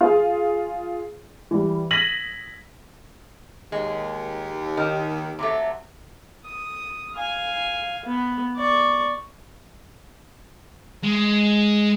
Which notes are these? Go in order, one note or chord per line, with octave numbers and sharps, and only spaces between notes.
F4 G#4
E3 G3
G#6 A#6 B6 D#7 F#7
D#2 G#3
D#3
C3 F#3 A3
D#6
F5 G#5
B3
D5 C#6
G#3